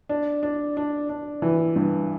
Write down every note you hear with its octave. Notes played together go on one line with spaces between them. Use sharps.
D4
D4
D4
D4
E3
G2